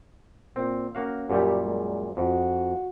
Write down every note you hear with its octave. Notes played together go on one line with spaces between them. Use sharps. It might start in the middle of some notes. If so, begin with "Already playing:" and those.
A#2 C4
A#3 C#4 F#4 F5
F#2 A#2 G3 G4
G#3
F2 F#4